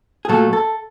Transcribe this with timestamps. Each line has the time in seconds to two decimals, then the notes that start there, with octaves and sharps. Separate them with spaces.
0.25 G#4
0.29 A#2 F#3 A3 A4
0.53 A4